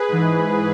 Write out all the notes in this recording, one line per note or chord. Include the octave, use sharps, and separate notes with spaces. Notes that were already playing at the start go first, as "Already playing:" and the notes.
Already playing: G#4 B4
G#2 E3